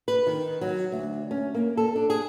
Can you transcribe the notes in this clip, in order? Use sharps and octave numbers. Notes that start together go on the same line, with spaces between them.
B4
D#3
F#3
D2
C#4
A#3
A4
D4
G#4